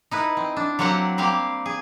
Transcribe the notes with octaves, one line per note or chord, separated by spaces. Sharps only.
D#4 E4 B4
C4
D4
F#3 A#3 C4 G4 F#5
G3 A#3 C4 G4 F5
G#4